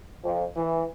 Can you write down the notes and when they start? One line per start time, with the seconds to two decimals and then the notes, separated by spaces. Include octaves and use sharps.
0.22 F2
0.55 E3